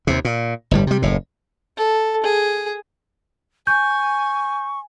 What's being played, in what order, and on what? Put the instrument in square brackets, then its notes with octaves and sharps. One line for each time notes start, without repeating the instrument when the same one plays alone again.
[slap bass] D#2 C3
A#2
G1 A2 G3
C3 G3
F#1 A2
[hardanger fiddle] A4
G#4
[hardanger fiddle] G#5 [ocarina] C#6 [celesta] G6